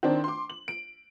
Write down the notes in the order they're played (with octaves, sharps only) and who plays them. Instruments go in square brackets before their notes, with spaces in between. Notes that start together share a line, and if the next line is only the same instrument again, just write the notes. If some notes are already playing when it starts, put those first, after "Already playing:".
[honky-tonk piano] D#3 C4 D4
C6 D6
F#7
D7